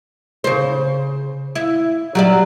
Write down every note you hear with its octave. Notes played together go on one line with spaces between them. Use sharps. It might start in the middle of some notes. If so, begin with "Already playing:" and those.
C#3 C5
E4
F#3 G3 D5